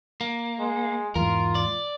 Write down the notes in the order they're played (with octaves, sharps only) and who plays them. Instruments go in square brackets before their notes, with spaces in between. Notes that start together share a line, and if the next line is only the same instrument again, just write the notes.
[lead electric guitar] A#3
[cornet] G#3
[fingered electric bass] E2 G#2 [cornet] F4 [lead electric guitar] A#4
[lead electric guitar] D5